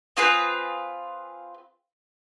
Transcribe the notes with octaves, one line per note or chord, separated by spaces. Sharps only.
C4 F4 G#4 B4